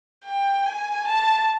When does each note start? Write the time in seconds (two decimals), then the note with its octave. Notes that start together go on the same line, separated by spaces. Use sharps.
0.25 G5
0.65 G#5
1.07 A5